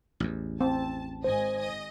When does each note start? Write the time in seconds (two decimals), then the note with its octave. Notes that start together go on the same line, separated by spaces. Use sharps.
0.20 A1 E2
0.61 C4 A5
1.24 G#1 C5 D#5 G#5
1.60 D#5